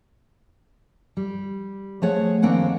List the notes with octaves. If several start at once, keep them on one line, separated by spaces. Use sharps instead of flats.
G3
F3 A3 G#4 C#5 F#5
D#2 A#3 C4 D4 F#5 G#5